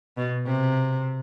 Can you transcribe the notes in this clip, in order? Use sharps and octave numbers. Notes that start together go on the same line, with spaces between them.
B2
C3